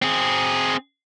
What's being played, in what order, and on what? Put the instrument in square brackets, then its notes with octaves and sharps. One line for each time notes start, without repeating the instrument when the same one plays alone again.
[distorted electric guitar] C4 G#4